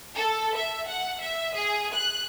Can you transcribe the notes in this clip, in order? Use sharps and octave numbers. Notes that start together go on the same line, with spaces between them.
A4
E5
F#5
E5
G#4
F#6